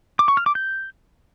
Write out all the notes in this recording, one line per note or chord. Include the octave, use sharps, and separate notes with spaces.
D6
C#6
F6
D6
G6